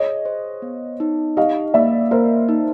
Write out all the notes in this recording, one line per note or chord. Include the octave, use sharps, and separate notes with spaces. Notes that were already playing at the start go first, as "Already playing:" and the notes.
Already playing: G#4 C#5 D#5
C5
B3
D#4
G4 D#5 F5
A#3 D5 E5
A#3 A#4 C5
D#4